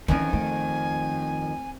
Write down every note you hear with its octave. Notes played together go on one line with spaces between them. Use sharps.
F2 D#3 E3 C#4 G#5
A3